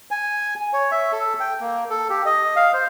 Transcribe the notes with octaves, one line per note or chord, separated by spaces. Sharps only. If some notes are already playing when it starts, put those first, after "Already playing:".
G#5
C#5
E5
A4
G5
A#3
A4
G4
D#5
F5
C5